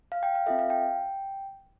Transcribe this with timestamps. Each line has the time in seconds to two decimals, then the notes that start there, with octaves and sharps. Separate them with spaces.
0.12 F5
0.23 G5
0.35 F5
0.46 C4 F4 A4 E5
0.59 F5
0.70 G5